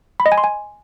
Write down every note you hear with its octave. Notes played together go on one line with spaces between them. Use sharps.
B5
D#5
G#5
C6
G#5